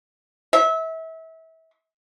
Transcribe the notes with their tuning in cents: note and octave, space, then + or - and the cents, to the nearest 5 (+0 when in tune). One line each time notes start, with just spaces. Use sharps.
E5 -30